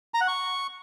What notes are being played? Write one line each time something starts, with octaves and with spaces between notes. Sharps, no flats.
A#5
F#5
C#6